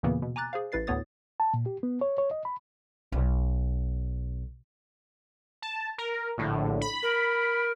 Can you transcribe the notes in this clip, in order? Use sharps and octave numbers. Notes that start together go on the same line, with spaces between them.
D#2 A#2 C#3 E3 A#3 B3
B2
G#5 A#5 D6 F#6 A6
G#4 C5 F5
A1 E4 B4 A6 C7
D2 A2 B3 C#5 D#6 A6
A5
A#2
G4
B3
C#5
C#5
D#5
B5
B1
A5
A#4
A#1 A2 D3
B5
A#4